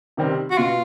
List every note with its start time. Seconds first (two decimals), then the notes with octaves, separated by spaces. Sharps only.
0.17 C3 D#3 G3 C4
0.51 F#4
0.58 B2 F4